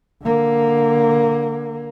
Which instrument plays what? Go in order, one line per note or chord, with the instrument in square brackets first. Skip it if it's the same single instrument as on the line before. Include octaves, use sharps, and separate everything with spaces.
[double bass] D3 A#3